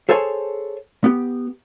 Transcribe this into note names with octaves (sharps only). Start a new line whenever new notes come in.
G#4 A4 C5 C#5 G#5 A5
B3 G4